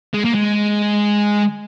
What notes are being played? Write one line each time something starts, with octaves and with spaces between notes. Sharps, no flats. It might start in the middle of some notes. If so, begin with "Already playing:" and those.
G#3
A#3
G#3